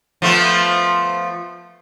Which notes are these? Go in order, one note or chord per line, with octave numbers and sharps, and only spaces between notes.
F3 A3 B3